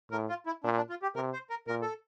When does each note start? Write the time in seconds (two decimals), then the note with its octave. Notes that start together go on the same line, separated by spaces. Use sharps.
0.11 A2 A#4
0.29 F4
0.46 E4
0.64 A#2 D4
0.77 D4
0.90 F4
1.02 G4
1.15 C3 A#4
1.33 C5
1.50 A#4
1.67 A#2 A#4
1.82 A4